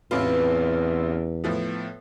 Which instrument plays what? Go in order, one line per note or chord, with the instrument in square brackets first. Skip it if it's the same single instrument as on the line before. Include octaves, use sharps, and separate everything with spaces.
[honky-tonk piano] A1 C3 F4 [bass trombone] E2 [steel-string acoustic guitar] B4
[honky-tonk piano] A2 F3 B3